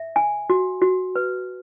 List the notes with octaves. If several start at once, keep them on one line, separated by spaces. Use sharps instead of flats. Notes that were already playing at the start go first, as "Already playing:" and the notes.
Already playing: E5
G#5
F#4
F#4
B4